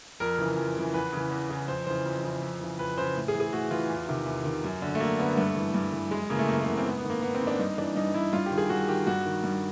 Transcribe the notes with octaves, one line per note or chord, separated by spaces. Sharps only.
F2 A#4
C#3 E3
F2
C#3 E3
E2 B4
C#3 E3
E2
C#3 E3
F2 C5
C#3 E3 C5
F2
C#3 E3
F2
C#3 E3
F2 B4
C#3 E3 C5
A2
G#4
E3
G#4
A2 F#4
E3 F4
E2
C3 D#3
E2
C3 D#3
F#2
D3
A3
F#2 A#3
D3 B3
G2 A3
E3
G2
E3
F#2 G#3
C#3 E3 A#3
A3
F#2 A#3
A#3
C#3 E3 B3
C4
G#2 B3
B3
D#3
A#3
G#2 B3
C4
D#3
D4
G2 D#4
E3 D4
G2 D#4
E3 E4
G2 F4
G4
D#3
G#4
G2 F#4
D#3 G4
G2 F#4
D#3
G2